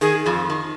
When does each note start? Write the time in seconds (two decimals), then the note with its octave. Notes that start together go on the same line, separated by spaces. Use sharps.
0.01 D#3 G#4
0.26 F2 F3
0.50 D#3